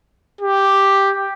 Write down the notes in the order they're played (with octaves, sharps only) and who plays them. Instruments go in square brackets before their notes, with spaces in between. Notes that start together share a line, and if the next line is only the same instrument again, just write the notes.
[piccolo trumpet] G4